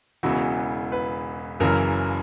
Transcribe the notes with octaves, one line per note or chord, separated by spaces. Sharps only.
E1 E2 C#3 E3 F#4
B4
F#1 F#2 C#3 E3 A#4